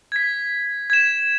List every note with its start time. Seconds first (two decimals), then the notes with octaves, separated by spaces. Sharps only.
0.12 G#6 B6
0.90 G#6 E7